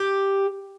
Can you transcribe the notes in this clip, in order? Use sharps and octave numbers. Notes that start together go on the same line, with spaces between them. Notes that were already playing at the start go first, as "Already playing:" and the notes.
Already playing: G4